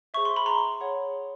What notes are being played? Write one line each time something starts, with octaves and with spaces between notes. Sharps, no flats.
G#4 C5 E5 C#6
C6
B5
A#5 C6
G#4 C#5 F#5